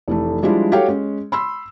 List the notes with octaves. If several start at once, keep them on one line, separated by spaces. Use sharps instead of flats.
F1 E3 A3
F3 G3 G#3 D4 E4 F4
F#4 G4 A4 C#5 F5 G5
G#3 C#4
B5 C6 E6